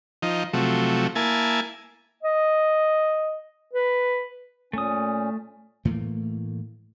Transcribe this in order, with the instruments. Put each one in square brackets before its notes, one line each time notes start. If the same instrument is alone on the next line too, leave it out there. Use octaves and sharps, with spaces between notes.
[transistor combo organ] F3 D#4
C3 F3 F#3 A3
A#3 E4 G#5 A5
[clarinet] D#5
B4
[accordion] A#2 C#4 [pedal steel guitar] A3 D#6
[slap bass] A2 E3 A3 A#3